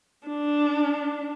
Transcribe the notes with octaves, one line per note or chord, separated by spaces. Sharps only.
D4